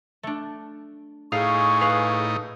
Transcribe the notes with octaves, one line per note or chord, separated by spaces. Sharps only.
A3 D4
A2 D#4 G#4 F5 C#6
B4 F5